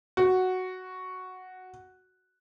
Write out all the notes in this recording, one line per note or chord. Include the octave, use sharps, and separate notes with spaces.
F#4